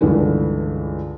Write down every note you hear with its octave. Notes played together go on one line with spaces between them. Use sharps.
C#2 G2 D3 E3